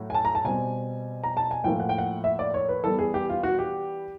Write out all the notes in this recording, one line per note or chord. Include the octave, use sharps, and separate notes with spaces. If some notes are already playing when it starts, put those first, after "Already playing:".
Already playing: A2 F#3 A3
G#5
A5
A#5
A5
B2 G3 C4 G#5
A#5
A5
G#5
A2 F3 A#3 G5
F#5
G5
F#5
E5
D5
C#5
B4
E3 G3 B3 A4
G#4
G4
F4
F#4
G4